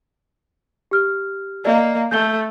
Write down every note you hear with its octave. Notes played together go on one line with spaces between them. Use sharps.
G4 F6
A#3 D5 D#5
A3 G6 G7